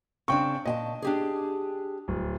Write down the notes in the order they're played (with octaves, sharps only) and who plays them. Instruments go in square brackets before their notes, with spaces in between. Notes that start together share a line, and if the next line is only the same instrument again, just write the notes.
[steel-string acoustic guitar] C#3 C4 D4 [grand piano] G5 C#6
[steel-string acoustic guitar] A#2 G#5 A5 [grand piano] D#5
[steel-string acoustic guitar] D4 G4 G#4
[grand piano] D1